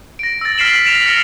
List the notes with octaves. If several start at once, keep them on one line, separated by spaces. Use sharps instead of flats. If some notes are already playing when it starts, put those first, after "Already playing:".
A#6 D7
E6 A6
F6 B6 C7 D7 E7 F#7
A6 B6 D7 E7 F7
F6 A#6 C7 C#7 F7